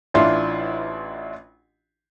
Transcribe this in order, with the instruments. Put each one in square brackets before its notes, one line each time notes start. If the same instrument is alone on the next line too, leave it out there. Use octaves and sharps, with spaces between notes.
[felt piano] A1 E3 D4 E4 F4 C6